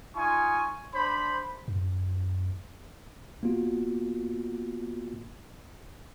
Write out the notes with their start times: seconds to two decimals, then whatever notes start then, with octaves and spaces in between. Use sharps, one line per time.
0.15 D#4 F4 G#5 C#6
0.93 D4 C5 B5
1.68 F#2
3.43 A#3 B3 F4 F#4